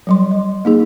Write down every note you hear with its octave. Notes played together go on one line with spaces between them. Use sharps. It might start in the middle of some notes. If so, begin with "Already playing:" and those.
F#3 G3 C6
D#5
A#3 D#4 G#4